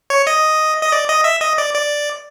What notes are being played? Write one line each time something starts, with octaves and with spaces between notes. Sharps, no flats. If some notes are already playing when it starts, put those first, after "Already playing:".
C#5
D#5
D#5
D5
D#5
E5
D#5
D5
D5